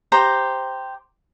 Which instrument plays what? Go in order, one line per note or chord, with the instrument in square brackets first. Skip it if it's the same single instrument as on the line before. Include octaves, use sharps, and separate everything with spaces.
[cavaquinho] G4 C5 A#5